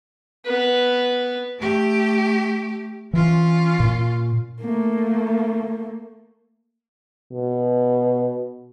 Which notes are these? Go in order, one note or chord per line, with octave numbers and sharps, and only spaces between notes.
B3 B4
A3 G4
E3 C#4 F4
A#2
A3 A#3
B2